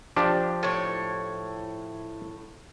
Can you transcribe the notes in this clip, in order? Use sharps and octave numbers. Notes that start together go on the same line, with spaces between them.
F3 D4 G4
A2 C#5